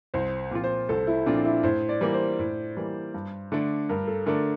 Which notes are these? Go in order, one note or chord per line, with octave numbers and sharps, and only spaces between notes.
C2 C5
A#2 F3 C4 F4
C5
C2 A4
E4
A#2 F3 C4 D4 F4
E4
A2 C5
D5
E3 G3 A#3
C5
A2
E3 G3 A#3
G2
D3 A3 D4
G2 A#4
A4
D3 A3 D4 A#4